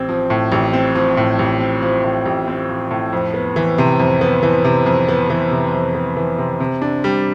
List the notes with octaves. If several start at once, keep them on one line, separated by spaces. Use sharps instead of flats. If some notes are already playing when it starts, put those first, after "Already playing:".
Already playing: A1 C4
F3
A2
A1
C4
F3
A2
A1
C4
F3
A2
A1
C4
F3
A2
F2
B3
E3
C3
F2
B3
E3
C3
F2
B3
E3
C3
F2
B3
E3
C3
C3
D4
G3